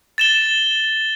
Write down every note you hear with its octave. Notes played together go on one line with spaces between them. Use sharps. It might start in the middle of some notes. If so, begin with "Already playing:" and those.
A6 E7 G7